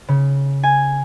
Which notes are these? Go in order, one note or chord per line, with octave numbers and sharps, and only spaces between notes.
C#3
G#5